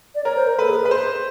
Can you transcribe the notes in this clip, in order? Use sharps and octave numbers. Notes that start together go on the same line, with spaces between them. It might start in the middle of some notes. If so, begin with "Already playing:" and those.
D5
A#4 C#5
C5
A#4
A4 B4
G#4
G#4 B4
C5